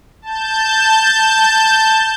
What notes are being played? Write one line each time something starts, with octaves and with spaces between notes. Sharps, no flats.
A5 G6